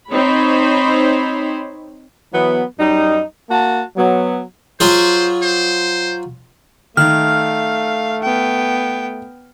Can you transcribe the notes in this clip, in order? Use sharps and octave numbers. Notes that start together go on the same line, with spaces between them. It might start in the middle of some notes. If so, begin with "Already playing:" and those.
C4 D#4 C5 C#5 B5
E3 F#3 B3
F#2 G3 D#4
A#3 F#4 A5
F#3 B3
F#3 F4 G#4 C5
C5
D#3 A3 F5 F6
B3 G5